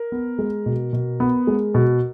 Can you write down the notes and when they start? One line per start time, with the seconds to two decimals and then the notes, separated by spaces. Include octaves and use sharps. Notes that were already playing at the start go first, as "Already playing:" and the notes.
Already playing: A#4
0.12 B3
0.39 G#3
0.66 B2
0.93 B2
1.20 B3
1.47 G#3
1.75 B2